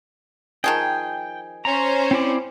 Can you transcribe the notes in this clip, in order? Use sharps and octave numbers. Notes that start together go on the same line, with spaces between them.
D#3 F3 G#4 G5
C#4 C5 A#5
C4 E4 D5